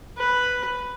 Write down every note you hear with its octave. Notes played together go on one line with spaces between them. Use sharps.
B4